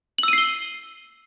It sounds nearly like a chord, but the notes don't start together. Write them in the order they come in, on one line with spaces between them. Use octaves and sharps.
F#7 E6 D#7 C7 G7